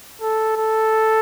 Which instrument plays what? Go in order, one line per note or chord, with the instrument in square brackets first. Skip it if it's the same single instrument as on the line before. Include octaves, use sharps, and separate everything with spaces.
[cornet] A4
A4